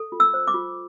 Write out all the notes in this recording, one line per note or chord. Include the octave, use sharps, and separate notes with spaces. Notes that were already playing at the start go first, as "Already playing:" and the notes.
Already playing: A4
F4
E6
C5
D6
F4